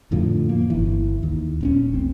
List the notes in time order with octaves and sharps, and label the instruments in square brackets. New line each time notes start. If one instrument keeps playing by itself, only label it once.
[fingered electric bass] F2 A2 D3 F3
A#3
G1 E3
D#2
D#1 C4 C#4
A1 C4